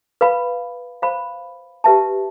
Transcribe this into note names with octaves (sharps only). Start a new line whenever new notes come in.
B4 F5 B5
C5 F5 B5
G4 B4 E5 A5